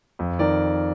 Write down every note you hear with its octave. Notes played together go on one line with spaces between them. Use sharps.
F2
D#3 A#4 D5